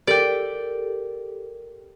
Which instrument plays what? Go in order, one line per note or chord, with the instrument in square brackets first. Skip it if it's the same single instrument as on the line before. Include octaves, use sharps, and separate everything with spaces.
[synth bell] G4 A4 A#4 [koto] D5 G5